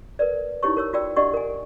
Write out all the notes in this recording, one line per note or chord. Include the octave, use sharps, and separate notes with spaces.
A#4 B4 D5
D#4 E4 G4 C#5 C#6
A#4 C#5 E6
F4 F#4 D5 G5 E6
D4 G4 D5 D#5 F#5 C#6
A#4 G#5